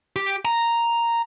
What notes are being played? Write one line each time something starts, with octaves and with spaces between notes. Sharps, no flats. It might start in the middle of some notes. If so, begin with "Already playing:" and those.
G4
A#5